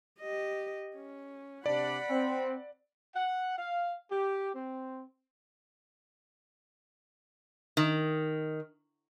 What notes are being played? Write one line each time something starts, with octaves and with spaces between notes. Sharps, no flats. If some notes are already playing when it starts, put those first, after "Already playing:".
G4 D#5
C#4
C3 D4 D5 F#5 B5
C4
F#5
F5
G4
C4
D#3